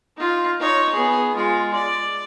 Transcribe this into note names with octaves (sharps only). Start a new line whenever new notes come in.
D#4 F4
D#4 C#5
B3 G#4
G#3 F4
D5